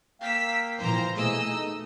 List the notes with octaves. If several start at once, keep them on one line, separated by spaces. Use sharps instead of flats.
A#3 F5 G5 E6 B6
A#2 E3 F3 C5 A#5
B2 E3 A3 A#3 G#4 D#5 E6
D#4